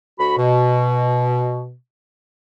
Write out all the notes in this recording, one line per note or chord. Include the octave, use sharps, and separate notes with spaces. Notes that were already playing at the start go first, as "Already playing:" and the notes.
D2 F#4 B5
B2